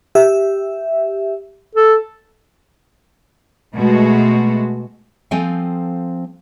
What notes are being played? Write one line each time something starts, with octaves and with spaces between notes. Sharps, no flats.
G4 E5
A4
B2 G#3 A3 F#4
F3 C4 A4 F5 G5 G#5